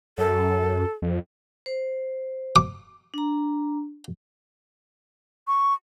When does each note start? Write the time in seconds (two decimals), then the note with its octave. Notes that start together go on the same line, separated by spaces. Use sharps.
0.18 F#2 A4
1.02 F2
1.66 C5
2.56 D6
3.14 D4 A#5
5.47 C#6